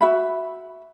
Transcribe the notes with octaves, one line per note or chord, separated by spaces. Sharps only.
F#4 E5 B5